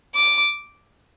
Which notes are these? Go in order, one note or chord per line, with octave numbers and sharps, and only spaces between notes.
D6